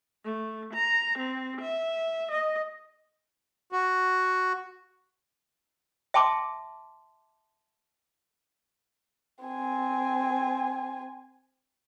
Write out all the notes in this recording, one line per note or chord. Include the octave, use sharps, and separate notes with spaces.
A3
A#5
C4
E5
D#5
F#4
E5 G5 A5 C6 D6
C4 G#5